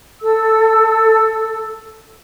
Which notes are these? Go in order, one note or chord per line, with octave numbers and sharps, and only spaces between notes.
A4 E6